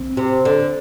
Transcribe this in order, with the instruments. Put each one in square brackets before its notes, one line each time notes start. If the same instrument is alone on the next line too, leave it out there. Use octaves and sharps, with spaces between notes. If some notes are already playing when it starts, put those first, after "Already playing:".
Already playing: [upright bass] C4
[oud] C3
D3